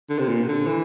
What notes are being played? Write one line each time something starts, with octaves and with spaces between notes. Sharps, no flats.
D3
C3
A#2
C3
D3
E3